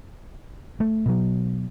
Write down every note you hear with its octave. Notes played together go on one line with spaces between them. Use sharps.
A3
B2 F#3